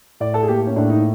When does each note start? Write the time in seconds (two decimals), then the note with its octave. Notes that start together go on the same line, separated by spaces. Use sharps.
0.20 A2 D5
0.34 A4
0.43 G#4
0.48 A#3 G4
0.66 C#4
0.76 A2 D4
0.90 D#4